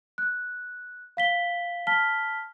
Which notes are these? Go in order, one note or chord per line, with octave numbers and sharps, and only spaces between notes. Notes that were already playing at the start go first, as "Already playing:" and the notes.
F#6
F5 B6 G7
A5 F6 B6 G7